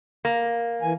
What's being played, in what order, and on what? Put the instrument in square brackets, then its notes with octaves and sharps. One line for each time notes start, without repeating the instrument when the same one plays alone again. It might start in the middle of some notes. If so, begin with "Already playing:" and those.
[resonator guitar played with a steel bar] A#3
[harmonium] E3 G#5